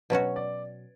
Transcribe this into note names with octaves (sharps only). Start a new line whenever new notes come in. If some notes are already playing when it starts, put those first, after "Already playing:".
B2 F#3 C#4 F#4 C#5
D5